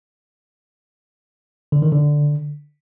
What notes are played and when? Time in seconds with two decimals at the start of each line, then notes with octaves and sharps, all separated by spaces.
1.72 D3
1.82 D#3
1.92 D3